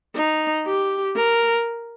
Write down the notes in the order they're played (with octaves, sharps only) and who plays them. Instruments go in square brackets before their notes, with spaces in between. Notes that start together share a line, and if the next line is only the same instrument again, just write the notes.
[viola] D#4
G4
A#4